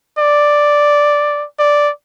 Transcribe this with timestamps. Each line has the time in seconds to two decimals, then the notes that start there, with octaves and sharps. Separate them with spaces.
0.19 D5
1.59 D5